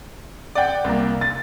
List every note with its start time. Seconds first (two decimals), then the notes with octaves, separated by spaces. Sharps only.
0.55 D5 F#5 G5
0.84 C2 A#3
1.21 A6